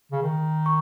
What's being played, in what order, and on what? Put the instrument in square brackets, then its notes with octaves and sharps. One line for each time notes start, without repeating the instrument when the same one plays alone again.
[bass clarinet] C#3
D#3
[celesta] C#6